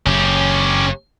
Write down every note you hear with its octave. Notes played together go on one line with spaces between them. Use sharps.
F#1 C#4 G4